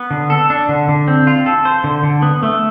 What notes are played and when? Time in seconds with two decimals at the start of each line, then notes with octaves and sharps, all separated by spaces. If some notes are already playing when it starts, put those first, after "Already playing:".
Already playing: B3
0.11 D3
0.30 A4
0.50 D4
0.69 D3
0.89 D3
1.08 C4
1.27 F4
1.46 A4
1.65 C5
1.84 D3
2.03 D3
2.22 B3
2.43 A3